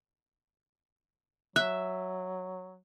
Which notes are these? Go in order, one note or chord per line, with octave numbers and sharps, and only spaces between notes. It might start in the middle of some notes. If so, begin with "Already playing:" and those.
F#3 E5 F#6